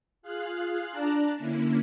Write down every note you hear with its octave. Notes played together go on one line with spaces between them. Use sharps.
F4 G#4 F5 F#6
D4 D5 A5 A#5 F#6
D3 A#3 C#4 E4